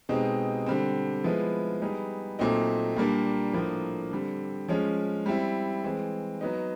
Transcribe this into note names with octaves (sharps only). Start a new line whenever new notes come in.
B2 G#3 C4 D#4 G4
D3 G3 C4
F3 G#3 B3 E4
G3 B3 D#4 G#4
A#2 F#3 A3 C4 D#4
A#2 G3 A#3 D4
A2 F3 A#3 D4
D3 G3 C4
F3 G#3 C#4
G3 C4 E4
E3 G#3 C4
F#3 B3 D#4